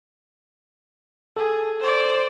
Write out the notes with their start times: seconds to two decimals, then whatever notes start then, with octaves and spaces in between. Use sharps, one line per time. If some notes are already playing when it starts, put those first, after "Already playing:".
1.37 G#4 A4
1.80 C5 D5